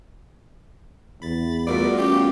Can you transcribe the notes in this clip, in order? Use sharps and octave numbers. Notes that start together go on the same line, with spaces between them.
E2 B5 A6
G3 A3 B3 F4 F#4 A#4 D5
C#4 G4